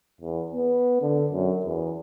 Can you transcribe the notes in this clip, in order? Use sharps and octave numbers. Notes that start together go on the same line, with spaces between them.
E2
B3
D3
F#2
E2